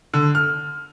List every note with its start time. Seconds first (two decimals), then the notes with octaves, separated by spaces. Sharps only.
0.14 D3
0.35 F6